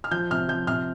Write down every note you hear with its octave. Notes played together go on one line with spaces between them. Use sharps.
F6
F3 G6
C3 F6
F3 G6
C3 F6